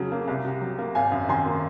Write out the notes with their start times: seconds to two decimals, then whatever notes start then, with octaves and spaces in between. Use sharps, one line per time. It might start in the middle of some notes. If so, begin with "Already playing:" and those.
Already playing: F2 C#3 F#3
0.12 A#3
0.27 C2
0.45 C3
0.61 F#3
0.78 A#3
0.95 G#1 F5 G#5
1.12 F#2
1.29 D#3 G#5 C6
1.46 A#3